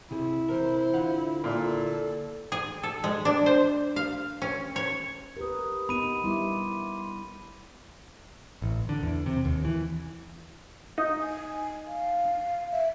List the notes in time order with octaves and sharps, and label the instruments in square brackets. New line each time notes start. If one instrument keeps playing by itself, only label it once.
[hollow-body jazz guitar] C3 G#4 [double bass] E4
[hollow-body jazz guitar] C3 E3 A#4 [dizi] C5
[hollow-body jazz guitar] D3 F4 F#5
[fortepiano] A#2 [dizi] A4
[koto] G#4
A4
G#3
D4
C5
F5
C#4
C#5
[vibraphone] G4 D#6 [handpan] A#4 B4
[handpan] B3 D#4 [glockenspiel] B5 D#7
[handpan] G3 B3 E4 [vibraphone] C6 D6
[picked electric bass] A1
D3
E2
C3
D#2
E3
[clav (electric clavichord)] D#4
[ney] G#5
F5
E5